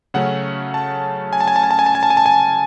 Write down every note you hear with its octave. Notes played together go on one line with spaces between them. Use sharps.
C#3 F#3 A3 C#4 F#5
A5
G#5
A5
G#5
A5
G#5
A5
G#5
A5
G#5
A5
G#5
A5
G#5